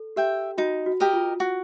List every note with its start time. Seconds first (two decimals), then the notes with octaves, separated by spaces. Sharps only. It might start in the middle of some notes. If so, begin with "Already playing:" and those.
Already playing: A4
0.16 G4 E5 G5
0.58 D#4 F#4
0.86 F#4
1.00 G4 A#4 D#5
1.13 F4
1.40 F#4